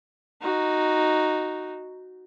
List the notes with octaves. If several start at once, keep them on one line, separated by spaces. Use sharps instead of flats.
D#4 F#4